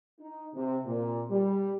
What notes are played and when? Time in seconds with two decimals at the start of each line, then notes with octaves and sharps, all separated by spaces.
0.20 D#4
0.54 C3
0.86 A#2
1.31 G3